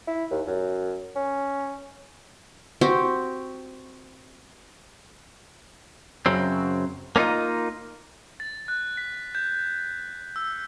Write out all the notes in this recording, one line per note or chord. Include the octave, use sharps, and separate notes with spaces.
E4
D#2
F#2
C#4
C4 F#4 G4
F#2 C#3 F#3 C4
A#3 C#4 D#4 F4 D#5
A6
F#6
B6
G6
E6